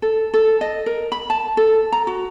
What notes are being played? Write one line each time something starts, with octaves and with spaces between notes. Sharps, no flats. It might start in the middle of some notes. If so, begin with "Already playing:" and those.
A4
A4
D#5
A#4
B5
A5
A4
A#5
F#4